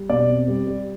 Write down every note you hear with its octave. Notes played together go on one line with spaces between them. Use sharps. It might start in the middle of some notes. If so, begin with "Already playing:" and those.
Already playing: G3
B2 D5
C4
G3
G3